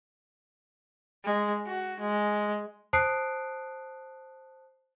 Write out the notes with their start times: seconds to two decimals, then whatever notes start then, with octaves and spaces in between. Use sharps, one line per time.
1.24 G#3
1.66 F#4
2.00 G#3
2.93 C5 A5 D#6 F#6 C7 D7